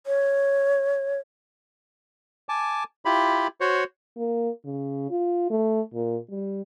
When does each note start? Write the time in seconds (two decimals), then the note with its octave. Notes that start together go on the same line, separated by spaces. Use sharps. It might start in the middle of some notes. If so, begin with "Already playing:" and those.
0.07 C#5
2.49 G#5 A5 D6
3.05 E4 F4 G4 B5
3.61 F#4 C5 C#5
4.18 A#3
4.65 C#3
5.11 F4
5.50 A3
5.94 A#2
6.31 G3